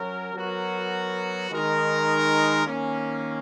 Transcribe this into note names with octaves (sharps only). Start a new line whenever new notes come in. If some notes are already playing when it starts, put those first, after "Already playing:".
Already playing: F#3 C#4 F#4 A#4
F#3 B3 F#4 A#4
D#3 G#3 D#4 A#4
D#3 A#3 C#4